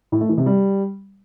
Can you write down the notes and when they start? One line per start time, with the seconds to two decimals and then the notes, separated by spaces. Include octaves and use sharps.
0.12 A2
0.21 A3
0.29 E3
0.38 C3
0.46 G3